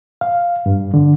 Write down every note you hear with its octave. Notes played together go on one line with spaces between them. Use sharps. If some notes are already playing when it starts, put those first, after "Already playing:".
F5
G2
D3